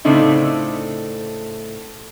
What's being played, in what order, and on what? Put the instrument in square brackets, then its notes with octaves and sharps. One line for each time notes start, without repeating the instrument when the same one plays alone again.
[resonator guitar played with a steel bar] A2 C#3 A3 C4 D4 D#4